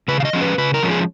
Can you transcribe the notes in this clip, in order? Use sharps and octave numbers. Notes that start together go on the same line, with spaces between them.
C#3 B4
F5
D#5
F3 G#3 C#4
B4
C#3 B4
A#4
F3 G#3 C#4
G#4